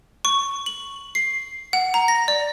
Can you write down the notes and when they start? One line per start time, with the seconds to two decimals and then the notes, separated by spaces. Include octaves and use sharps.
0.25 C#6
0.66 F#7
1.15 C7
1.73 F#5
1.94 A#5
2.08 A#6
2.28 D5